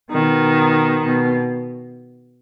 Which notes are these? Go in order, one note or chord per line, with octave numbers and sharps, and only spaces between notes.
B2 D#3
B2